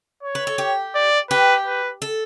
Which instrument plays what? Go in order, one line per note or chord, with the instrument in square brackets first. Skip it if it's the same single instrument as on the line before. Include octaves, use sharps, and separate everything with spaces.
[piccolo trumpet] C#5
[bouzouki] B4
A4
G4
[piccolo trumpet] D5
[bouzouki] G4 [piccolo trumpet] B4
[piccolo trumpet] B4
[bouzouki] A4